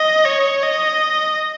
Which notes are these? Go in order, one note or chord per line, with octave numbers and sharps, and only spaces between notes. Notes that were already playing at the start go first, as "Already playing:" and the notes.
Already playing: D#5
C#5
D#5